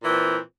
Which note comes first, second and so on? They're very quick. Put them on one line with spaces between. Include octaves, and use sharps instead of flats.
A#2 E3 C4